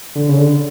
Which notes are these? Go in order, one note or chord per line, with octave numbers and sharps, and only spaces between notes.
D3
C#3
D3